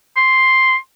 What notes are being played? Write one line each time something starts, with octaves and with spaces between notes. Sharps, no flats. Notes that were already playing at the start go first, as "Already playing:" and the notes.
C6